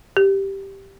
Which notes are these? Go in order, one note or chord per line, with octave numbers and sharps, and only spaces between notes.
G4